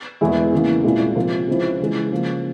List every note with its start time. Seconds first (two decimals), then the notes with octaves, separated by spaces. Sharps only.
0.21 E1 E2 E3 G#3 E4
0.53 C#3 E3 A#3
0.84 C2 A#2 G#3 E4
1.16 C3 F3 C4 F4 A#4
1.47 C#2 C#3 F3 C4 E4
1.80 C#3 E3 G#3
2.12 C#3 F3 A#3